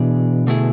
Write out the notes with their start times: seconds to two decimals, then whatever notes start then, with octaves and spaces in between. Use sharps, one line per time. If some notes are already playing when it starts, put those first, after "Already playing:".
Already playing: B2 E3 B3 D4 G#4
0.47 D3 A3 E4 G#4